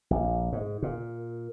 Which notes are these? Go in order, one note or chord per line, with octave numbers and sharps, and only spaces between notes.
A#1
G#2
A#2